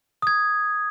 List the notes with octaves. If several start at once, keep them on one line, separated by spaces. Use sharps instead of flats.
D#6 G#6